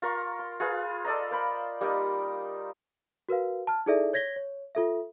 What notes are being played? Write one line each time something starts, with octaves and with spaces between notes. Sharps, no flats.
F4 A#4 A#5 C#6
C6
F4 G#4 B4 F5
A4 D5 D#5 A#5
A#4 C5 B5
G3 A#3 D#4
F#4 A#4 B4 F5
A5 F6
D#4 E4 G#4 A4 D5 E5
C#5 G#6 A#6 B6 G7
C#5
F4 A4 E5